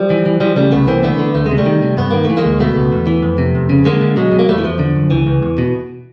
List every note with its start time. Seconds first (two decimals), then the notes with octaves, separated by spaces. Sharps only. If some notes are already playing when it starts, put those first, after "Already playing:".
Already playing: F3 G3
0.10 E3
0.26 E3
0.40 E3 F3 G3
0.56 C#3 G3 A3
0.72 C2 A3 B3
0.88 E3 A#3 C4
1.03 D3 A3 B3
1.19 D3
1.35 D2 A3
1.46 G#3
1.51 C3
1.58 G3 A3
1.66 D#3
1.83 C3
1.97 G2 B3
2.11 D#3 A#3
2.25 E3 A3
2.37 G#3 A#3
2.45 D2
2.60 B2 A3 B3
2.77 C#2
2.92 E2
3.07 E3
3.22 F2
3.38 C3
3.55 F2
3.70 C#3
3.85 D3 G#3 A#3
4.01 D3
4.16 B2 F#3 G#3
4.32 B2
4.39 A#3
4.48 E2 G3 A3
4.58 E3
4.64 E2 F3
4.79 D3
4.96 F#2
5.11 C#2 E3
5.27 C#2
5.42 E2
5.58 B2